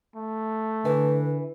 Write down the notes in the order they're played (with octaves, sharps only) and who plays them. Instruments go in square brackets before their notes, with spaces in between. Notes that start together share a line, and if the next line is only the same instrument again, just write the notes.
[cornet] A3
[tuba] D3 [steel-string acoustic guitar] E3 [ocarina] B4